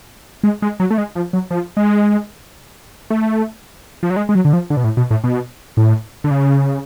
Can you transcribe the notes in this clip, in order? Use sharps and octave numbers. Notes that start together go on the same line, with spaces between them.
G#3
G#3
F#3
A3
G#3
F3
F#3
F3
G#3
A3
F3
F#3
G#3
G#3
F#3
D3
F3
D3
B2
A2
B2
A2
B2
A2
D3
C#3